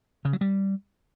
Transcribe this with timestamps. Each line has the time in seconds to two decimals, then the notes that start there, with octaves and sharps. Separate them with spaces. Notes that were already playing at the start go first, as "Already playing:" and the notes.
0.25 C#3
0.33 F#3
0.41 G3